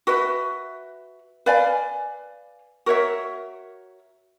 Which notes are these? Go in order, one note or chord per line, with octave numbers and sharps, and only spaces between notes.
F#4 B4 E5
B4 D5 F5 G#5
F#4 A#4 C#5 E5